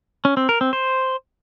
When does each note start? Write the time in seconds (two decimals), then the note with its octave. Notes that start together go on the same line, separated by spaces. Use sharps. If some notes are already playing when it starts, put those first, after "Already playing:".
0.25 C#4
0.37 C4
0.49 A#4
0.61 C4
0.73 C5